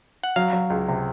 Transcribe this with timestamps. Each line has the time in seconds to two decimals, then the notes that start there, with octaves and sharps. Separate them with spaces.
0.23 F#5
0.36 F#3 F5
0.53 F#3
0.70 C#2
0.88 C3